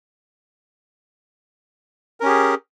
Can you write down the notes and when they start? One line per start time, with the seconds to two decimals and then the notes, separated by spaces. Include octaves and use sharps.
2.20 A#4
2.23 C#4
2.26 G4
2.28 G#4